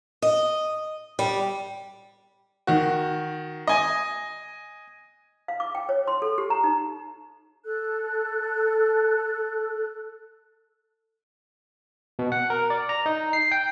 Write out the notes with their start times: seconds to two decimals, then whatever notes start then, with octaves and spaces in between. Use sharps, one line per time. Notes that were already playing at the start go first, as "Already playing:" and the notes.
0.22 D#5
1.19 G3
2.67 D#3 F#4
3.67 D#5 G#5
5.48 F5
5.60 D6
5.75 G5
5.89 C#5
6.07 C6
6.22 A4
6.38 G4
6.50 A#5
6.64 D#4
7.64 A4 F#6
12.19 B2
12.32 F#5
12.50 A#4
12.70 D5
12.89 A#5
13.06 D#4
13.33 C7
13.52 G5